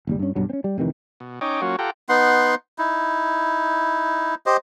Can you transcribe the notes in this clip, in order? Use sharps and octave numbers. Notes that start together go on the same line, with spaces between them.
F#1 D#2 G3
G2 C#4
B1 G2 F#3
C4 C#4
G3
F1 C3 D#3 E3
B2
C#4 D#4 C#5 D#5 G5 D6
F#3 A#3 C#4 F4 F#4
F4 G4 A4 F#5 G5 A#5
B3 D#4 F#5 C6
D#4 E4
G4 C5 D#5